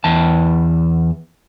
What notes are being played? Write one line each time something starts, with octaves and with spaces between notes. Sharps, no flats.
E2 A5